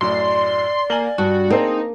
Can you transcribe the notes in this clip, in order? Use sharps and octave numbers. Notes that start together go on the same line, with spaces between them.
F#2 A2 D5 C6
A#3 G#5 F#7 G7
G2 F#4
A#3 C4 D#4 G#4